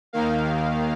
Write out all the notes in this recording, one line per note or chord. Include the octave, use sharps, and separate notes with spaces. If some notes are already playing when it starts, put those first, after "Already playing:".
D#2 D#3 A#3 F5